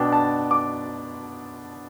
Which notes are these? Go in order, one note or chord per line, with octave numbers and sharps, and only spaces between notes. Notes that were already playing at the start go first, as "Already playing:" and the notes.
Already playing: B2 B3 D4 G5
A5
D6